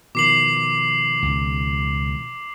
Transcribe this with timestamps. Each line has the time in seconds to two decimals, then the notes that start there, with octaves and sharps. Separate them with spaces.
0.15 B2 D#3 F3 D6 C7 F#7
1.23 C#2